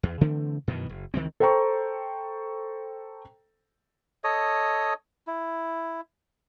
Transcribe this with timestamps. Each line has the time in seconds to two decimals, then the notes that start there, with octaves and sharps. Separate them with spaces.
0.03 E2
0.21 C#3 E3 A3 C4
0.68 F#2 B2 D#3 E3
0.89 F#1
1.14 C#2 D#3 E3 C4
1.40 A4 C5 G5 A#5 C#6
4.24 A4 C#5 D#5 D#6
5.27 E4